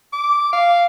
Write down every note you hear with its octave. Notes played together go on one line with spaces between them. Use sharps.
D6
F5